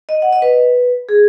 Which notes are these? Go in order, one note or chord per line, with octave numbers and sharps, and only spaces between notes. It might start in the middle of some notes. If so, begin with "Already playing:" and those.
D#5
F#5
D#5
B4
G#4